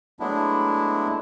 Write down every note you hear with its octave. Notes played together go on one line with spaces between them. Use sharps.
F#3 G#3 A3 B3 D4 E4